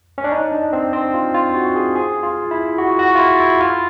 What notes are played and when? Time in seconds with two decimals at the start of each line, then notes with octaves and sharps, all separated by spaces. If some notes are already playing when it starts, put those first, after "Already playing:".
0.18 C#4
0.24 D4
0.32 D#4
0.52 D4
0.73 C4
0.93 C4
1.14 F4
1.34 F4
1.54 F#4
1.75 G#4
1.96 G#4
2.23 F4
2.51 E4
2.78 F#4
2.99 F#4
3.15 F4
3.19 E4
3.40 E4
3.61 F4